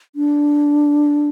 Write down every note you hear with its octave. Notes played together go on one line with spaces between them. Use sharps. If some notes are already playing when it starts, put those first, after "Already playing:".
D4